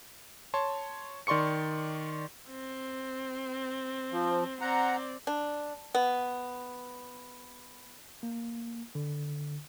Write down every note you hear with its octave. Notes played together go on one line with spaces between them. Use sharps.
C#5 A5 C6
D#3 D5 C6 C#6 C#7
C4
F3
C4 D5 F#5 A#5
D4
B3
A#3
D3